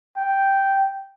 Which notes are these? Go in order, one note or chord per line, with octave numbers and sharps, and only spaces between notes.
G5